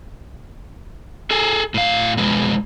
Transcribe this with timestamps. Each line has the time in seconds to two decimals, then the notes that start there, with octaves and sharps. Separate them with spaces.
1.31 G#4 A4 G#5
1.74 A2 F5
2.17 F2 B2 G#3 B4